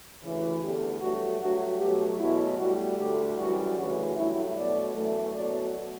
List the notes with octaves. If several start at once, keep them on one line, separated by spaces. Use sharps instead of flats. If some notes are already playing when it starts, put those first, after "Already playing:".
D2 C#3 E3
E2 D3 A3 G4
G2 F#3 A3 F#4
G2 F#3 A3 F#4
B2 F#3 A3 G4
E2 B2 F#3 A3 E4
A2 G3 F#4
D2 D3 A3 G4
F#2 E3 G3 F#4
D2 C#3 E3 F#4
G2 F#3 A3 E4
B2 F#3 A3 D5
F#2 E3 A3
B2 F#3 A3 D5